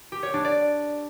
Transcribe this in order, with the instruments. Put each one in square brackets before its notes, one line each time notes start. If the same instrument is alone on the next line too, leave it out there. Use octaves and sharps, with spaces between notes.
[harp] G4
C#5
D4
D5